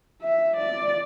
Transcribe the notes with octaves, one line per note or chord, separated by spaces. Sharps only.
E5
D5